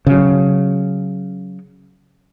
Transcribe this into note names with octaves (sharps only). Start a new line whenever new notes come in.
C#3 F#3